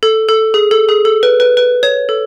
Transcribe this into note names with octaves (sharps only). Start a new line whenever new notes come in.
A4
A4
G#4
A4
G#4
A4
B4
B4
B4
C#5
A4